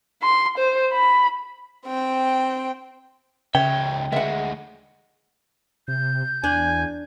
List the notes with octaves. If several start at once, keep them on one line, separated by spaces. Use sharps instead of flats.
C6
C5
B5
C4 G5
C#2 C#3 C#5 E5 G5
D2 G#3 E5 F#5
C3 G6
E2 D4 G#5